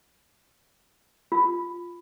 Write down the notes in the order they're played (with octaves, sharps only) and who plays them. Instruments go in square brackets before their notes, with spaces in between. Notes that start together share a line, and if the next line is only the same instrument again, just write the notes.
[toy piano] F4